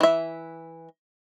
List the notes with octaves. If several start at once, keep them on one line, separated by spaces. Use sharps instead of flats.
E3 E5